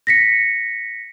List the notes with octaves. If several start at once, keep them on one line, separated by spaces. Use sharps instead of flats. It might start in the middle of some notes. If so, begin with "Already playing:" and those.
A#6 B6 C#7